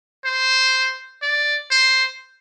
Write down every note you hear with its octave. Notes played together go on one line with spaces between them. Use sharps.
C5
D5
C5